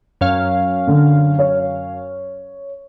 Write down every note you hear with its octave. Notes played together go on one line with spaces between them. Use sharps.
F#2 C#4 F5
D3
C#5